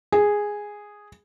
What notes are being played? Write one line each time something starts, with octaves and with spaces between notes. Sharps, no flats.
G#4